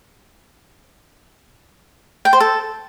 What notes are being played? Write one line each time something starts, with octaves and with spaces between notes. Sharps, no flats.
G5
C5
A4